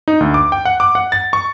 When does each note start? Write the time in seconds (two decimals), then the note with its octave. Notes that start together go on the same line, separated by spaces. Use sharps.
0.08 D#4
0.20 D2
0.34 D6
0.52 G5
0.65 F#5
0.80 D6
0.95 F#5
1.12 A6
1.33 C#6